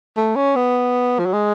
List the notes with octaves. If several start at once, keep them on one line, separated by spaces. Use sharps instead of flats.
A3
C#4
B3
F3
F#3
G#3